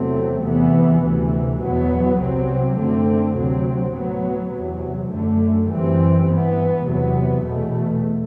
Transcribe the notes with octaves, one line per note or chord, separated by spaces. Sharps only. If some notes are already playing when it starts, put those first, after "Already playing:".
Already playing: E2 C3 F#3 A3 C4
E2 C3 E3 B3
D2 C3 E3
E2 B2 F#3 B3
C2 C3 F#3 C4
F#2 D3 A3 C4
D2 C3 F#3 C4
A2 F#3 B3
E2 C3 F#3
F#2 D3 A3
F#2 E3 G3 C4
G2 E3 B3
E2 C3 F#3 B3
E2 B2 A3